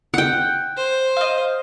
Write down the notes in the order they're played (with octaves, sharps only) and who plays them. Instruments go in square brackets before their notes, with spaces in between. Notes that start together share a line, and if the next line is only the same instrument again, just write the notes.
[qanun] F#5 G5
[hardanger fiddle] C5
[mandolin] D#5 F5